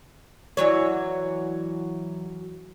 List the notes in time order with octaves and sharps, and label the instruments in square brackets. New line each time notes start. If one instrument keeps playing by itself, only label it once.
[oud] E3 F#3 C#5